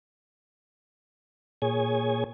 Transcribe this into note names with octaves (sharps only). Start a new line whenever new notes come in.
A#2 G#4 C#5 G#5